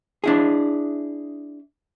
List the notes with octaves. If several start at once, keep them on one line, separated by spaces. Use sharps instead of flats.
D4 E4 G#4